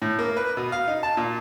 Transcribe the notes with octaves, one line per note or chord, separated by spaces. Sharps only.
A2
A#3
B4
B2
F5
D#4
A5
A#2